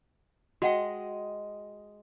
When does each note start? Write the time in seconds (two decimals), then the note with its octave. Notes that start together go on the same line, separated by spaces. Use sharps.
0.62 G#3 F#4 D#5 F#5 G5